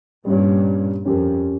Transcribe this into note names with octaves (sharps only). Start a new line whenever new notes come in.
G2 A#2 G3 C#4 G4 C#5
F2 C#4 G4 A#4